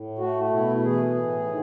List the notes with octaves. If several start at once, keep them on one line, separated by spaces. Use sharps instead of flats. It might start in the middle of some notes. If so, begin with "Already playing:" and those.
Already playing: A2
A3 F#4
B2 E4
E3 G#4
A2
D#3